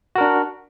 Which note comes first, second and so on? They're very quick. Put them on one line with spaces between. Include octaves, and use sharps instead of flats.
F#4 A#4 D4